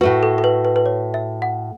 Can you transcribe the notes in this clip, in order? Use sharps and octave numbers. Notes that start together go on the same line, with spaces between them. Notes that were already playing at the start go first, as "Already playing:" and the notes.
A2 A3 F#4 B4
A4
A4
B4
B4
B4
C#5
E5
F#5